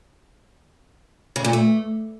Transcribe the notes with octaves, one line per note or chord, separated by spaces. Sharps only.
C#3
A#2
A3